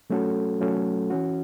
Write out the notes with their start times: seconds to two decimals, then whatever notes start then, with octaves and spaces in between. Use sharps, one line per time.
0.10 F#3 A3 C#4 F#4 A4
0.60 F#3 A3 C#4 F#4 A4
1.10 E3 C#4 F#4